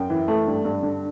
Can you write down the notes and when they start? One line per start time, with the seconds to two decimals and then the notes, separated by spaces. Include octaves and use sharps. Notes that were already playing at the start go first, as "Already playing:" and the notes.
Already playing: F#2 G5
0.10 E3
0.28 A3
0.47 G2
0.65 G2
0.83 D3